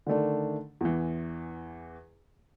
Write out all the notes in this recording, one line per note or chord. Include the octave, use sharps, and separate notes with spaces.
D3 D#3 A3 D4
E2 E3